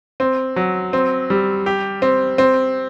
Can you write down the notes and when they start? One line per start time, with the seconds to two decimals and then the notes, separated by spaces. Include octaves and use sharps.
0.20 C4
0.56 F#3
0.93 C4
1.30 G3
1.66 G4
2.02 C4
2.38 C4